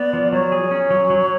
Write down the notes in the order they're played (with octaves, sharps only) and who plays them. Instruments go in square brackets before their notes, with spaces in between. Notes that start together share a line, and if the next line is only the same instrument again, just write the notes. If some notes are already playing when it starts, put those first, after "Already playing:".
Already playing: [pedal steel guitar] B3 [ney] D5
[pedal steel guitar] F3
[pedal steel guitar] F#3 [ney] C#5
[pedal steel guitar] G#4
C#4
F#3
F#3